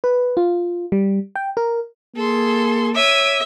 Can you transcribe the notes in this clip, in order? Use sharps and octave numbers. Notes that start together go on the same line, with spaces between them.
B4
F4
G3
G5
A#4
A#3 G#4 A4 C6
C#5 E5 D6 D#7